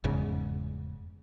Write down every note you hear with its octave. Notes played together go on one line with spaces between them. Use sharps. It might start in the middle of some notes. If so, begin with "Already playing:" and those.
F1 E2 G#2 C#3